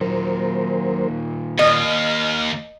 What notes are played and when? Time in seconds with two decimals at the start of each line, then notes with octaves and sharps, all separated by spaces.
0.01 A#2 D#3 F#3 A#4 C5
1.59 D#2 D#5 F6